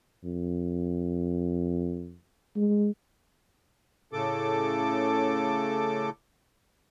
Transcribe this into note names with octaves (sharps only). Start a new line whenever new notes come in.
F2
G#3
A2 C#3 A4 D6